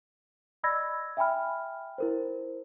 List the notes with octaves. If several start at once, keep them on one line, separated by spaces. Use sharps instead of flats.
D5 D#5 B5 E6 G#6 A#6
E5 G5 G#5 B5 F6
E4 A#4 C5